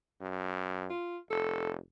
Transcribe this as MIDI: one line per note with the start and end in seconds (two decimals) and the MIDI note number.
0.21 0.88 42
0.90 1.18 65
1.30 1.77 29
1.30 1.70 69